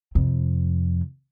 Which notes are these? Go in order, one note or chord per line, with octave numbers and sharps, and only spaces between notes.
F2 C3